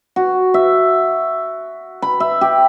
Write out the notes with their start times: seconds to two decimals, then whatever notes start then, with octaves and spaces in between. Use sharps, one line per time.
0.16 F#4
0.54 E5
2.02 B5
2.20 E5
2.41 G4